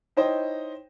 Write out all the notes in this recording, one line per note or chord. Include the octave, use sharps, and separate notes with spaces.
D#4 E4 C5 C#5 D#5 G5